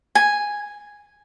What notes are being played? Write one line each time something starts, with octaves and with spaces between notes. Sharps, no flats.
G#5